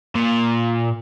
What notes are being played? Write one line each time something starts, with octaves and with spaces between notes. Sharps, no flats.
A#2